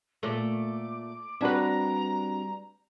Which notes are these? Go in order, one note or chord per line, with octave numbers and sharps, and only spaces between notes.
A#2 A3 D6
G3 C4 D4 F#4 B4 A#5